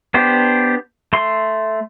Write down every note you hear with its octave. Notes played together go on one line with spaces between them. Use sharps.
B3 D4 G4 C5
A3 C6